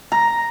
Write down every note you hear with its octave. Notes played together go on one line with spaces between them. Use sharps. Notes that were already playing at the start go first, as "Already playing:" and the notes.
A#5